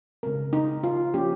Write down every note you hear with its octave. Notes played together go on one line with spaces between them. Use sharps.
C#3 G#3 C4 A#4
D#4
F4
F3 A#3 C#4 G4